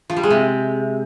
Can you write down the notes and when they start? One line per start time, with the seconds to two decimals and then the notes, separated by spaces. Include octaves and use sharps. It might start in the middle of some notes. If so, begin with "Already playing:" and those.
0.10 F3
0.16 G3
0.23 G#3
0.30 C3